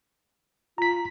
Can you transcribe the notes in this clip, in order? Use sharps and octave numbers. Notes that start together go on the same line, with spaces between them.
F4 A#5 B6